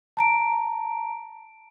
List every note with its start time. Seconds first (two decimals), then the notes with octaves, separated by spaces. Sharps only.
0.17 A5 A#5 D7